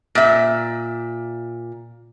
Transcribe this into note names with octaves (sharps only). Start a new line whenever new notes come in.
A#2 E5